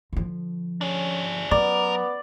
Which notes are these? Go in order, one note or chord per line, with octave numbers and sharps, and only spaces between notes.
D3 F3
C#4 D4 G#4
F#3 B3 A#4 D5